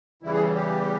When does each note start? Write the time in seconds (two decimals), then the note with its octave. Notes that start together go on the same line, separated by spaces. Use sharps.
0.22 E2 C#3 E3 G3 E4
0.33 G#4
0.55 G4